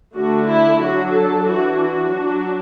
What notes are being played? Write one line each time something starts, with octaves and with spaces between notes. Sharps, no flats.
D3 A3 D4 F#4
E4
F#3 D4 F#4
A4
E3 D4 F#4
F#4
F#3 D4